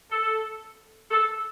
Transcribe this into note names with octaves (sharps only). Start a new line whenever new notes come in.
A4
A4